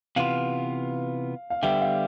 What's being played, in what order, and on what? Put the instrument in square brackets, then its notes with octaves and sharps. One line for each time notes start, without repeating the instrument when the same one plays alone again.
[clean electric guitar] C3 E3 B3 F4 [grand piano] F5
[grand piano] F5
[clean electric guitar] D3 G3 B3 [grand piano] E5 G5
[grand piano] F5